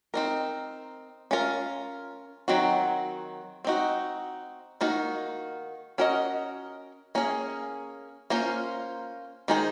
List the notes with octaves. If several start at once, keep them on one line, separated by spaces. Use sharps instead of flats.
C4 D#4 A#4
C#4 F4 A#4
D#3 F#3 C4 F#4
C4 D#4 F#4
D#3 A#3 D#4 F#4 A#4
C#4 F#4 A#4 D#5
A#3 C#4 G#4
A#3 C#4 F4 C5
D#3 G#3 D#4 G#4 C5